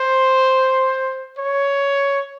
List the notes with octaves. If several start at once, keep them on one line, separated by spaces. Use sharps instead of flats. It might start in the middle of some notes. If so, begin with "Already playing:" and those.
Already playing: C5
C#5